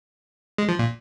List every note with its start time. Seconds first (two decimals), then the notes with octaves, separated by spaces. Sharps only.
0.58 G#3
0.69 F3
0.79 A#2